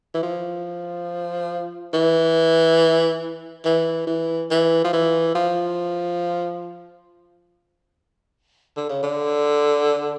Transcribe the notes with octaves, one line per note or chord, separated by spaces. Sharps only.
E3
F3
E3
E3
E3
E3
F3
E3
F3
D3
C#3
D3